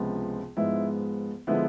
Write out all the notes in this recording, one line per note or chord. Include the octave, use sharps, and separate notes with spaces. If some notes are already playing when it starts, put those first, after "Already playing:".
Already playing: C#2 C3 F3 G#3 B3
G#2 F3 G#3 B3 E4
D3 F3 G#3 B3 E4